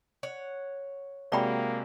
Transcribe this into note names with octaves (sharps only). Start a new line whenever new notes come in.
C#5 F#5
C3 G#3 A#3 F#4 D5 G5 B5